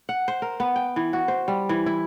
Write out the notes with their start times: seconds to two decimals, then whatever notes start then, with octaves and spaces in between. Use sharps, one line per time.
0.09 F#5
0.28 C5
0.42 A#4
0.60 B3
0.76 G5
0.96 E3
1.13 F#4
1.28 C5
1.48 G3
1.69 E3
1.86 E4